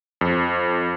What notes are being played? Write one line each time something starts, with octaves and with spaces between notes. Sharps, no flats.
F2